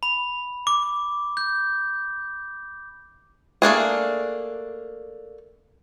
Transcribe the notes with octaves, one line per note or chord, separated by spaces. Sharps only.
B5
D6
G6
A3 A#3 D4 G#4